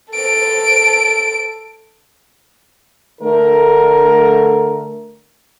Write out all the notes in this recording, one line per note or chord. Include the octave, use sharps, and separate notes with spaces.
A4 D7
D3 A3 A#4